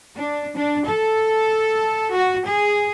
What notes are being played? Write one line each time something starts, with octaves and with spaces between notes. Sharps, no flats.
D4
D4
A4
F#4
G#4